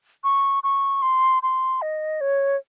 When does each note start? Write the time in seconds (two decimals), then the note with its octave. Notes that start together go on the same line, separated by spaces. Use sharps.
0.24 C#6
0.63 C#6
1.02 C6
1.43 C6
1.82 D#5
2.21 C#5